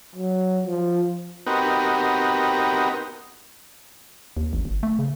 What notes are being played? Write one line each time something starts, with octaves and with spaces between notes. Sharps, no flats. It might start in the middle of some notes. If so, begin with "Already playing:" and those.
F#3
F3
B3 C4 D#4 F#4 G4 A#4
D#2
A1
G1
A3
C#3